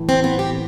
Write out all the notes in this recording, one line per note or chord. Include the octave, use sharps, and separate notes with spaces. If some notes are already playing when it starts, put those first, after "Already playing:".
Already playing: A2 E3
C4
B3
G4